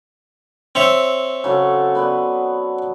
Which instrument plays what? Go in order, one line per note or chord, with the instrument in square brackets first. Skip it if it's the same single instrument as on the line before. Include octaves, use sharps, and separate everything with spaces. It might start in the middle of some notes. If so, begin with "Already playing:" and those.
[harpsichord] C4 C#5 E5
[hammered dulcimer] C#3 F#3 A4
B3 B4 D5